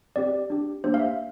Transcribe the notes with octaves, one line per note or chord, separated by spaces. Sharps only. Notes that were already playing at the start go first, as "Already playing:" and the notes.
C4 G4 D5
D4 G4
A#3 D4 G4 C5
F5
E5